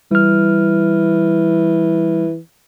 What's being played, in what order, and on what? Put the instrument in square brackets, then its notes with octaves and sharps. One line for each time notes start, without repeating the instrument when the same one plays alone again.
[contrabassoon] E3 [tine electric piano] G3 F6